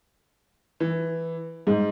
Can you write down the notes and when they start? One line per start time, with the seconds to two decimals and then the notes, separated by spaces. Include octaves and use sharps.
0.80 E3
1.67 G#2